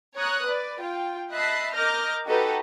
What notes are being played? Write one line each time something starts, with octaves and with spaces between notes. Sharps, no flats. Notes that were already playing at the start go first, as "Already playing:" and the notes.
C#5 A#5 D#6 F#6
B4 D5
F4 G5
D#5 E5 A5 B5 F#6 C7
A#4 D#5 D6 F6 G6 A#6
D#4 F#4 G4 A4 B4 D#5